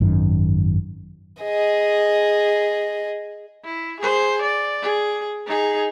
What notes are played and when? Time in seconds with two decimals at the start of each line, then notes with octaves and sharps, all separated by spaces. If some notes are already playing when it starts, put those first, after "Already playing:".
0.01 G#1 F#2 D#3
1.43 G#4 D#5
3.64 E4
4.00 G#4 C5
4.42 D5
4.82 G#4
5.47 D#4 G#4